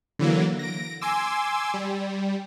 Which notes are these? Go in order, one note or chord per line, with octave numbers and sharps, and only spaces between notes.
D3 E3 F#3 A#3
A#6 D7
G#5 C6 D6 E6
G3